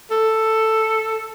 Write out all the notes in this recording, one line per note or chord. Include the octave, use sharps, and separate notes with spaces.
A4